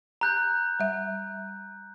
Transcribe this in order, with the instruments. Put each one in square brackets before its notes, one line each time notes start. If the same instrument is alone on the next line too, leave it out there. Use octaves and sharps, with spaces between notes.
[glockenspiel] A#5 F#6 G6
[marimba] G3 E5